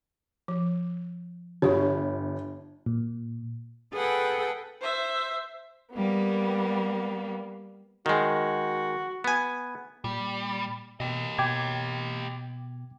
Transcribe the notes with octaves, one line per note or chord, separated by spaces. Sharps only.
F3
G1 F4 G4 C#5
A#2
G#4 A4 B4 F#5 G5
C5 E5
G3 A#3 B3
D#3 G#3 F#4
B3 G#5
A#2 G3
B2 G4 D#5
B2 G5 D6 G#6